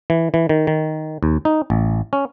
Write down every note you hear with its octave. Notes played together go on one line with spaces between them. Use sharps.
E3
E3
D#3
D#3
D#2
D#4
A1
C#4